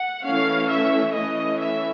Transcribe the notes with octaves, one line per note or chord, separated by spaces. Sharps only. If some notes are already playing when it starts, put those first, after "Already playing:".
Already playing: F#5
E3 A3 C#4 F5
E5
E3 A3 C#4 D#5
E5